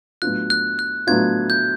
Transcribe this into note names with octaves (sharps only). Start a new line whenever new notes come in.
A2 F#3 B3 D4 F4 F#6
F#6
F#6
A2 F#3 B3 D4 F4 G#6
G6